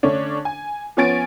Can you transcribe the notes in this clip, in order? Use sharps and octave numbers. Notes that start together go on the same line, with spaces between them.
D3 A3 C#4 D4
G#5
F3 B3 C#4 G#5 A6 D7